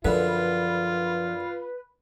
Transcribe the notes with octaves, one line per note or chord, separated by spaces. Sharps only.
F#2 D3 F3 F4 B4